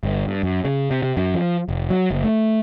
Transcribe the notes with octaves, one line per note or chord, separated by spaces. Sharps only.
G1
G2
F#2
C#3
C3
C3
F#2
F3
F1
F#3
F#1
A3